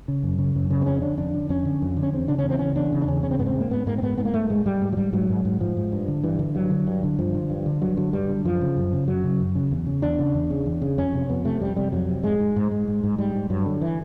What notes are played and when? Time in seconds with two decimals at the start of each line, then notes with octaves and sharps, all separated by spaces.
0.08 C#3
0.23 F#2
0.39 C#3
0.56 F#2
0.70 C#3
0.81 C4
0.86 F2 C#4
1.02 D3 D4
1.17 F2 D4
1.35 D3
1.49 F2 C#4
1.65 D3
1.82 F2
1.97 D3
2.03 C#4
2.12 E2 C4
2.28 C#3 D4
2.39 C#4
2.44 E2
2.50 C4
2.59 C#3 C#4
2.76 E2 D4
2.93 C#3
3.02 D4
3.07 E2 C#4
3.23 C#3 C#4
3.31 C4
3.39 G#2 B3
3.46 C4
3.56 G#2 A#3
3.70 G#2 B3
3.87 G#2 A#3
3.98 C4
4.02 G#2 B3
4.18 G#2 B3
4.25 A#3
4.34 G#2 A3
4.50 G#2 G#3
4.65 G#2 G3
4.82 G#2
4.93 F#3
4.97 G#2 G3
5.13 G#2 F#3
5.30 G#2
5.45 G#2
5.61 G#2 F3
5.77 G#2
5.92 G2
6.08 D3
6.24 G2 E3
6.39 D3
6.55 G2 F#3
6.71 D3
6.87 G2
7.03 D3
7.19 G2 F3
7.35 D3
7.50 G2
7.66 D3
7.82 G2 F#3
7.97 D3 F#3
8.13 G2 G3
8.29 D3
8.44 F#2 F3
8.61 C#3
8.77 F#2
8.93 C#3
9.08 F#2 F#3
9.24 C#3
9.40 F#2
9.55 C#3
9.71 E2
9.87 C#3
10.02 E2 D4
10.19 C#3
10.34 E2
10.50 C#3
10.66 E2
10.82 C#3
10.97 F2 C#4
11.14 C3
11.29 F2 B3
11.45 C3 A3
11.60 F2 G3
11.76 C3 G3
11.92 F2 F#3
12.09 C3
12.24 G#2 G#3
12.39 G#2
12.56 G#2
12.71 G#2
12.88 G#2
13.04 G#2
13.18 G#2 G3
13.35 G#2
13.50 G2 F#3
13.66 D3
13.82 E3